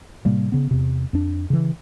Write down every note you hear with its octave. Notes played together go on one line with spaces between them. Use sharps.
A2 C3 G3 A#3
C#3 B3
E2 C3
F2 D4
C#3 E3